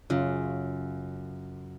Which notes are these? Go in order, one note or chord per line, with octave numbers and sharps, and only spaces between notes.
F#2 C#3 C#4 F4